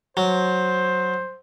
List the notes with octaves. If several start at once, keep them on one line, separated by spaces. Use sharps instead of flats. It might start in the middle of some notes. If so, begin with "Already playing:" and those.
F#3 C5